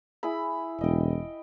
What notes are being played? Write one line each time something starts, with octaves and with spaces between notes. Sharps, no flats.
E4 G#4 B5
E1 D#5 G5